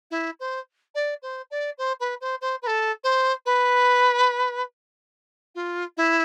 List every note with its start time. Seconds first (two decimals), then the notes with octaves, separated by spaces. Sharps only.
0.11 E4
0.40 C5
0.95 D5
1.22 C5
1.51 D5
1.78 C5
2.00 B4
2.21 C5
2.41 C5
2.62 B4
2.67 A4
3.03 C5
3.45 B4
5.55 F4
5.97 E4